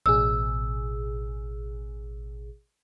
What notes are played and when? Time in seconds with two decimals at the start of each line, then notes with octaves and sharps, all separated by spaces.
0.06 A1 B2 G#4 E6